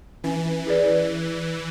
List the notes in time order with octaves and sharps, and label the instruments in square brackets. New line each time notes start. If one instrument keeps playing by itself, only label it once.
[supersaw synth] E3 [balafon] C#4
[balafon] E4 G#4 B4 D5